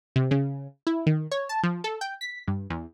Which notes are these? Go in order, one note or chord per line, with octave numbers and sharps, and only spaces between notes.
C3
C#3
E4
D#3
C#5
A5
F3
A4
G5
B6
G2
E2